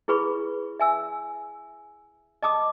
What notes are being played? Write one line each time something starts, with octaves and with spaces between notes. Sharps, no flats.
E4 G#4 B4 B5 C#6
E5 G#5 E6
D#5 A5 D6 D#6